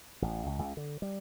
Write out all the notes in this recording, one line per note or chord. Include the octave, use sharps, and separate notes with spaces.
A1
C#2
C#2
D3
G3